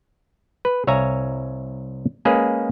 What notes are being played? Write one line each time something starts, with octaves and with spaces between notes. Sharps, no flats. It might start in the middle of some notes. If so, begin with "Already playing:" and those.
B4
C2 C#5 E5 F5 G#5 A#5
G#3 A#3 C#4 G#4 B4